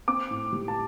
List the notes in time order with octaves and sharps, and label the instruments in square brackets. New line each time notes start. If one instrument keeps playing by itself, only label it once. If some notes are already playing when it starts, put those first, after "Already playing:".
[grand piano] C4 D6
A2
G3
A5